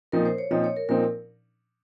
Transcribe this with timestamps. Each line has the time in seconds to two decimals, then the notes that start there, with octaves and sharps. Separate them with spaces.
0.12 A#2 F3 C4 D#4 A#4
0.25 C5
0.38 C#5
0.51 A#2 F3 C4 D#4 D#5
0.64 C#5
0.76 A#4
0.89 A#2 F3 C4 D#4 A#4